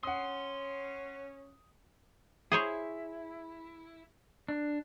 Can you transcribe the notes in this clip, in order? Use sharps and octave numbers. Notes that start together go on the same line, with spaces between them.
C#4 F#5 C6 D#6
E4 G#4 C5 C#5
D4